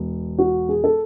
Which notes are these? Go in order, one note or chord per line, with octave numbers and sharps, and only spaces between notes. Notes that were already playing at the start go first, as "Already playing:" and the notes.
Already playing: E1
F#4
G#4
A4